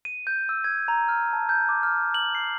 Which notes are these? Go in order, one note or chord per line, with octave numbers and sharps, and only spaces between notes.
D#7
G6
E6
G#6
A#5
F6
A5
G6
D6
F6
F#7
C7